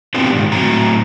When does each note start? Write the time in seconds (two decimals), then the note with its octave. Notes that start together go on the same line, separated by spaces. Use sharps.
0.14 B3 C4 D4 F4 G4
0.33 F2 G#2 D#3
0.52 A2 F#3 C4 A#5